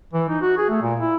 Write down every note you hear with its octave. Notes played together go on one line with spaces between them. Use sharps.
E3
D#4
F#4
G#4
A3
A#2
E4